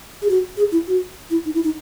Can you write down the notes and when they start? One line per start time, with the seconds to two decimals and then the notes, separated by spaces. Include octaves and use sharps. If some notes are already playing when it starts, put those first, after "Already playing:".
0.22 G#4
0.29 F#4
0.57 G#4
0.72 E4
0.87 F#4
1.30 E4
1.45 D#4
1.54 E4
1.64 D#4